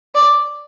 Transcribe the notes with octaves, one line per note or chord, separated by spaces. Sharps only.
D5